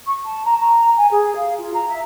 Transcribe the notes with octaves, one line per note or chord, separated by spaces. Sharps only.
C#6
A5
A#5
A#5
G#5
G#4
F5
F4
A#5
E5